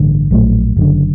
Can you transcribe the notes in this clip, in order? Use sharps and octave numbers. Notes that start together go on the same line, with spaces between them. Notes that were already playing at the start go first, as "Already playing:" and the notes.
Already playing: A1 G2 D3
A#1 A2 F#3 A3
F#1 F#2 D3